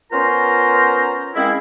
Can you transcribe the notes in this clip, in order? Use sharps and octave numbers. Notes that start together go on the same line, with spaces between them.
B3 C#4 F4 A#4 C5 A#5
G#3 A#3 C4 C#4 E4